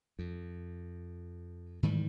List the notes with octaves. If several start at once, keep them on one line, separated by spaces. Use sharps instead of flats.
F2
G#2 D#3 E3 G3